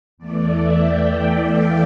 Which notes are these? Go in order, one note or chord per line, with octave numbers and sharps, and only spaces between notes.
E2 E3 A3 D5
E5
G5
F5